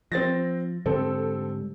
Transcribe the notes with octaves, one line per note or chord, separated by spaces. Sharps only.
F3 C4 A6 A#6
G#2 D3 G3 C4 A4